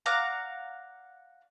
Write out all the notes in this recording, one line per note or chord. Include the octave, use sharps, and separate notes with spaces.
D5 F5 F#5 A#5